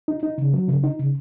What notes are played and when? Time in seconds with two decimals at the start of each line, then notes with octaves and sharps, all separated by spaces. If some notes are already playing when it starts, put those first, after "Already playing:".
0.08 D#4
0.23 D#4
0.38 C#3
0.53 F#3
0.68 C#3
0.84 D#4
0.99 C#3